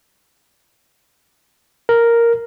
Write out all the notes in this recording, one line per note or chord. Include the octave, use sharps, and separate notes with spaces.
A#4